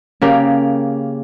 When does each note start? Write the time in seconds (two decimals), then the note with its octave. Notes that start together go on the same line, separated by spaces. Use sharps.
0.22 C#3 A#3 G4